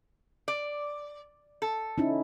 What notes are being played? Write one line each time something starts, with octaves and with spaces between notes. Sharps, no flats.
D5
A4
C#4 D#4 E4